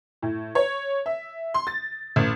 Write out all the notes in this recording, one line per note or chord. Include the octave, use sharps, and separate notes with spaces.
A2
C#5
E5
C6
A6
A1